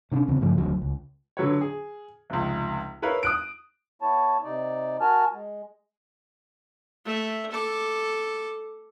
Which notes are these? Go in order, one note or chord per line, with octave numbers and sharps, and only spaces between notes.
C3 C#4 D4
E2 C#3 C4
G2 C#3 F3 A3
E1 D2 D#3 F#3
C#2
D3 F#3 B4 C#5
G#4
F1 C#2
E4 A#4 B4 C#5 F5
D#6 F#6 D7
B3 E4 C#5 A5
C3 D#4 D5
F#4 A#4 G#5 A5 F6
G#3
A3 E5
A4 D6